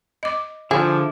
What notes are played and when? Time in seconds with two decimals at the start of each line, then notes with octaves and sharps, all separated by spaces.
0.23 D#5 D6
0.71 D3 F3 E4 G#4